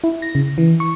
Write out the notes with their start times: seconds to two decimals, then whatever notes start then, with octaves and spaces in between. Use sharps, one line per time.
0.04 E4
0.22 A#6
0.35 C#3
0.58 E3
0.80 C#6